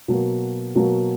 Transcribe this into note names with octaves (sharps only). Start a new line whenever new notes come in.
B2 F#3 A#3
B2 F#3 A#3